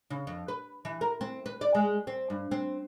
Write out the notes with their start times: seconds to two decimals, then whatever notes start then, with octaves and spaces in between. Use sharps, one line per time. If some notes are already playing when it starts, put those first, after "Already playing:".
0.10 C#3
0.27 F2
0.48 B4
0.85 E3
1.01 A#4
1.21 C4
1.46 B4
1.61 D5
1.75 G#3
2.07 C4
2.30 G2
2.51 C4